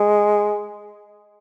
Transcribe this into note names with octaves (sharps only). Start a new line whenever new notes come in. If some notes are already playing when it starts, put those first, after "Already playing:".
Already playing: G#3